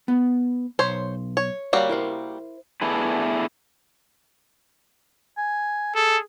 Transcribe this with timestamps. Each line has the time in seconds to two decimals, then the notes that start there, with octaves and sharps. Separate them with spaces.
0.08 B3
0.79 B1 C5 C#5 C6
1.37 C#5
1.73 G3 A#3 F#4 C#5 F5
1.89 E4 A#4 C5
2.82 A3 B3 D4 E4 G#4 B4
5.37 G#5
5.95 G#4 A4